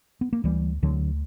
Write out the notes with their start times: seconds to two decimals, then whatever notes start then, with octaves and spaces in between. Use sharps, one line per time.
0.21 B3
0.33 A#3
0.44 D2 E3 G3
0.82 D2 D3 F#3